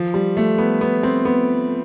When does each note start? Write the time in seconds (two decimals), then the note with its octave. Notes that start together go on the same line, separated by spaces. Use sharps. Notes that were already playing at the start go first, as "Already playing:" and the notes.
Already playing: F3
0.14 G3
0.37 A3
0.58 B3
0.81 B3
1.03 C4
1.25 B3